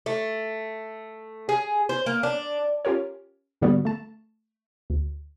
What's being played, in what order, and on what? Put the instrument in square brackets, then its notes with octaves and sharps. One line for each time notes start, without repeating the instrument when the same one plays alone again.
[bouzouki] A3
G#4
C5
A#3
D4
[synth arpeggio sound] C#4 F4 G4 A#4 C#5
G#2 D3 G3 A#3 B3 F#4
A3 A5
D2